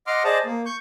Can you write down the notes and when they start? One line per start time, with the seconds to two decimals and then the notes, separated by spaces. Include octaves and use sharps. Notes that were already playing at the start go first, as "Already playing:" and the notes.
0.07 D#5 F#5 C6 D6 F6
0.24 G#4 C5 D5 D#5 A5
0.45 A#3
0.66 C#6 G6